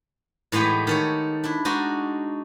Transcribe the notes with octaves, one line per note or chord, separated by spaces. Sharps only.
A2 E3 G#3 B3 G4
D#3 A4 C#5
D4 E4
G#3 D4 D#4 F#4